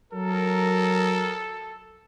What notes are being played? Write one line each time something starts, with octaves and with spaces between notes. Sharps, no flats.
F#3 A4 A#4